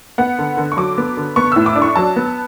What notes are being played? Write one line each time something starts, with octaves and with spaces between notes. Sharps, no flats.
B3 F#5
D3
D3
C#6
F#3 D6
B3
D3
B3 C#6
A2 E6
D6
D4
C#6
F#3 A5
B3